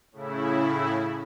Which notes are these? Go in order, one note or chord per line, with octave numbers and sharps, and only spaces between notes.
A2 C#3 E4